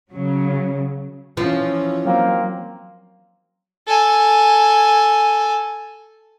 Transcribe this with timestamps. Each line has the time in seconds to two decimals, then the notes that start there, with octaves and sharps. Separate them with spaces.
0.12 C#3 F#3
1.37 E3 F3 C#4
2.06 F#3 A#3 C4
3.87 A4 G#5